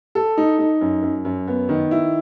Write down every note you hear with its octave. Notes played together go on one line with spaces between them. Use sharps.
A4
D#4
D#4
F#2
F#2
F#2
B3
D#3
E4